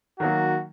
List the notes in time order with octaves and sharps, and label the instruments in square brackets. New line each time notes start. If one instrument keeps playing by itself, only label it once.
[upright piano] D#3 F#3 A#3 [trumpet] F#4